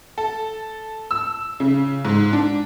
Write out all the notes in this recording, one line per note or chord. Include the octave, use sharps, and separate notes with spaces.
A4
E6
C#3
G#2
D4